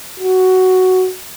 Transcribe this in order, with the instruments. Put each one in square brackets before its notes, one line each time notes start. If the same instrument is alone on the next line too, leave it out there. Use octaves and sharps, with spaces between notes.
[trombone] F#4